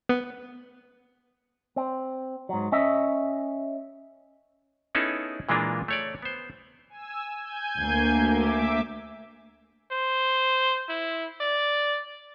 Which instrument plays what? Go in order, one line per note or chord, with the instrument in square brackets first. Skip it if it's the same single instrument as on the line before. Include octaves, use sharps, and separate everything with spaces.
[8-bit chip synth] B3
[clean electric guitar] C4
G#2 F#3
C#4 D#5 E5
[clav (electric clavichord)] B3 C#4 D#4 E4 G#4 A4
A#2 E3 G#3 A#3 D4 F4
A3 C#5 D5
B3 C5
[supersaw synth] G#5 E6
G#5 G6 G#6
[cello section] D2 A#3
[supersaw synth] E5 D6
[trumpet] C5
E4
D5